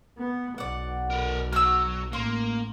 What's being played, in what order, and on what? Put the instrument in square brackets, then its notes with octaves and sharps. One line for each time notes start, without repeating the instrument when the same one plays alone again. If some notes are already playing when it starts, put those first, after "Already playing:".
[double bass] B3
[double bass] B1 [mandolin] D5 F#5
[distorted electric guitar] A#4 B4
[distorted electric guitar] F#3 [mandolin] E6 F6
[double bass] A1 [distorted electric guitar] A#3 [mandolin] C6